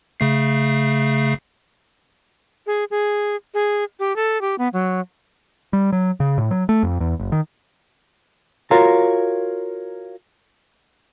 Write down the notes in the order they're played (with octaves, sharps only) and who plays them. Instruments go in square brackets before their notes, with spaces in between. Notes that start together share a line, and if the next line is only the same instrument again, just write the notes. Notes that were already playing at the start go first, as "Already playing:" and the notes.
[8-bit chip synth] C#3 A3 C7
[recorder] G#4
G#4
G#4
G4
A4
G4
B3
F#3
[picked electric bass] G3
F#3
C#3
A2
F#3
A3
F2
E2
F#1
D#3
[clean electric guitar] F4 F#4 A#4 C#5 F5 A#5